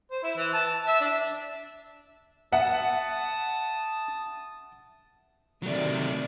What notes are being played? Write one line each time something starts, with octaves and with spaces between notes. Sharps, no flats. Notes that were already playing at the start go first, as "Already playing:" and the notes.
C5
E4
E3
A5
E5
D4
E5 F#5 A5 D#6
C3 D#3 F#3 A3 D5